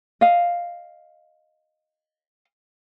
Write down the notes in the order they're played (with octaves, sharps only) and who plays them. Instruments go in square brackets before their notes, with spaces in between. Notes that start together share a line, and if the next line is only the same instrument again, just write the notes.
[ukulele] D#5 F5